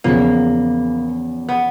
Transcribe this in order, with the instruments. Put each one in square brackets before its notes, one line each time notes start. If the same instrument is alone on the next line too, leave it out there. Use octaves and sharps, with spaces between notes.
[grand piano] E2 C#3 F3 [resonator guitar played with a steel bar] A#3
[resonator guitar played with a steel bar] B3